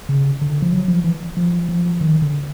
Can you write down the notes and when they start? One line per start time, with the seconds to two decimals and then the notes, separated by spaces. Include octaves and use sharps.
0.09 C#3
0.41 D3
0.62 F3
0.72 F#3
0.88 F3
1.04 E3
1.37 F3
1.69 F3
2.01 D#3
2.22 D3